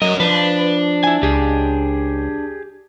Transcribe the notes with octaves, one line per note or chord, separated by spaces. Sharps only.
F#3 C#4 A#4 D#5
F3 D4 B4
E4 G#5
C#2 G4 G#4